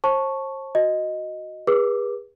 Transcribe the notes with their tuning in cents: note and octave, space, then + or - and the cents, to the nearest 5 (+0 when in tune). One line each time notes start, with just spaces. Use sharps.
C5 +40 A5 -5 C#6 +0
F#4 -5 D#5 +0
G#4 -40 B4 -35 D6 +0